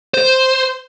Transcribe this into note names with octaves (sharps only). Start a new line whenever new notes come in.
C5